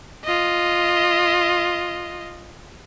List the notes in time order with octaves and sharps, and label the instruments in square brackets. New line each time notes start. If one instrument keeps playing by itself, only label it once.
[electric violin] F4 D#5